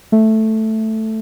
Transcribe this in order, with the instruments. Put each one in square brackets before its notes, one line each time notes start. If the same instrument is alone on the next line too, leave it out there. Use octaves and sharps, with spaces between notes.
[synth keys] A3